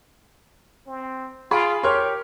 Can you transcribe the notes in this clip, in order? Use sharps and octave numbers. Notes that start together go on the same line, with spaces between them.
C4
F4 G#4 B5 D7
G4 A#4 C#5 C6 F6